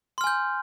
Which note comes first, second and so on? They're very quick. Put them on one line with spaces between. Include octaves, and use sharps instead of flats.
C6 F6 G#5 G6